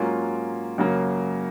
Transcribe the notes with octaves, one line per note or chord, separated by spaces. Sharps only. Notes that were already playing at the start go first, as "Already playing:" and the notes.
Already playing: G#2 F#3 A#3 C#4 F4
F#2 C#3 F#3 A#3